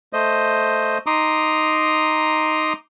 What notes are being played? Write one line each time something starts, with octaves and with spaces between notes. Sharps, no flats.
A3 C5 D#5
D#4 A#5 C6 D6 D#6